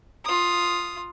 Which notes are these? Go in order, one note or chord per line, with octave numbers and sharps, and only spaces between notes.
F4 D#6